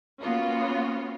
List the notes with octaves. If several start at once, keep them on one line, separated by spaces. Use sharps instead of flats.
A#3 B3 C#4 F4 F#4